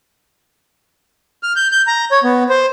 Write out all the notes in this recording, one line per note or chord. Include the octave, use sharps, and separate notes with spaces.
F6
G6
G6
A#5
C#5
B3
C5